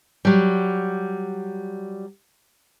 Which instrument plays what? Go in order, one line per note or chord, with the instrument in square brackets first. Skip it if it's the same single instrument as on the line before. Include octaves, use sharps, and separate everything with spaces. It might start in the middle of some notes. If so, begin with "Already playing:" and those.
[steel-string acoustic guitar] F#3 G3